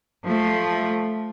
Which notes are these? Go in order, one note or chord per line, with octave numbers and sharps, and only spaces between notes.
F3 A3